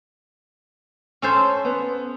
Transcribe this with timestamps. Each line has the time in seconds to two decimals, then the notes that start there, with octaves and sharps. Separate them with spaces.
1.22 C#4 A4 C5
1.65 B3